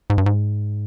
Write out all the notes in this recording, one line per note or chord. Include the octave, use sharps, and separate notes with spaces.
G#2
G2
G#2